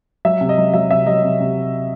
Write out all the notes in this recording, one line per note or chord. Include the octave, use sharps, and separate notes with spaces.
F#3 E5
C3
D#5
F#3
F#3 E5
C3 E5
F#3 D#5
C3
C3